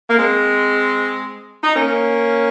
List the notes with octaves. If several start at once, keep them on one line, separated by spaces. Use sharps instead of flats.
A#3
G#3 C4
D#4
A#3 C#4